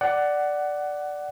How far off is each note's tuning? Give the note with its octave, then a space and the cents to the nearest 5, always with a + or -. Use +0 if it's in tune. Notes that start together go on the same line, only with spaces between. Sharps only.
D5 +0 F#5 +15